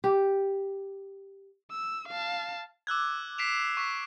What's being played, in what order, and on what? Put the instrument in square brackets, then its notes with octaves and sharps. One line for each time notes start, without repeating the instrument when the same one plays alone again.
[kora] G4
[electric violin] E6
F5 A5
[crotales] D6 E6 F#6 G#6
B6 C7 D7 E7 F7
C#6 B6